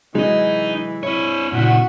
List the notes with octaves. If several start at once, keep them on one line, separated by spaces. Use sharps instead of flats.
C3 E3 F#3 G#3 D#4 D#5
C4 E4 C#5
A#2 C#3 E4 F#4 F#5 B6